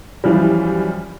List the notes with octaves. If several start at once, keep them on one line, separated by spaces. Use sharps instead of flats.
F#2 E3 F3 G3